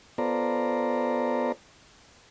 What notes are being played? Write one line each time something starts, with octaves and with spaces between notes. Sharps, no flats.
B3 F4 A4 C5 D5 A#5